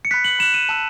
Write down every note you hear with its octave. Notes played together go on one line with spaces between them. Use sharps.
C#7
B5 F#6 B6
F#7
B5 F#6 E7
D#7
A5 E6